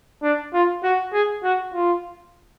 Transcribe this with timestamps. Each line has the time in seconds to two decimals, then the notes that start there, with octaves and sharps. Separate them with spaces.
0.23 D4
0.54 F4
0.83 F#4
1.13 G#4
1.43 F#4
1.74 F4